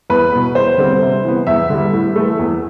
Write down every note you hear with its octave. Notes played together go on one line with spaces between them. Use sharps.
E2 B4
B2 B3
E2 C5
D3 G3 C4
C3
E3 B3
E2 E5
D3 G3
A2
E3 A3
E2